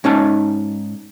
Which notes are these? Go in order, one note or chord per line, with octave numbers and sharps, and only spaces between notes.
G#2 C#4 D#4 A5